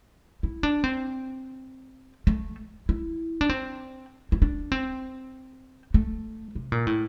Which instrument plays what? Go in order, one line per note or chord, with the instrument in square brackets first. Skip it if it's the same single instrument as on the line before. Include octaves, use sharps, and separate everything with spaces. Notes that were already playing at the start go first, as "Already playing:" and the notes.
[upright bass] E4
D4
C4
A3
E4
D4
C4
E4
D4
C4
A3
C3
A#2
A2